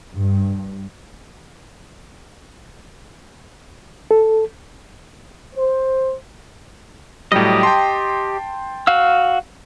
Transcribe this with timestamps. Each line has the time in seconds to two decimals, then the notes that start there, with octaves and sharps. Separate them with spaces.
0.16 G2
4.11 A4
5.55 C5
7.32 A2 F#3 G3 G4 D#5
7.63 G5 A5 C6
8.87 F#4 F5 E6